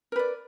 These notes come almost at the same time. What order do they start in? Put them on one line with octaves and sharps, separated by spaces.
A#4 B4 D5